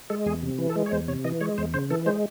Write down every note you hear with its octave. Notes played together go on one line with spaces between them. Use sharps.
G#3 A4
E2 G#4
C3
E3
A4
G#3
C#5
E2 C5
C3 C#5
E3 D#5
G#3 C#5
E2 C5
C#3 C5
E3 A4
G#3 C5